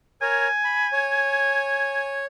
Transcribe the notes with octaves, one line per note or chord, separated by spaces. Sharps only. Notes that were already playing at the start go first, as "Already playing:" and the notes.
A#4 C#5 G#5
B5
C#5